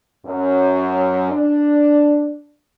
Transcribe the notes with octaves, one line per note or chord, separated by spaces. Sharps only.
F#2
D4